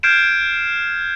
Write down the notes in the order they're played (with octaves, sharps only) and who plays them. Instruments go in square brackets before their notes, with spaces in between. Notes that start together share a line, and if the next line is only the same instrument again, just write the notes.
[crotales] F6 G6 G#6 C7 D7 E7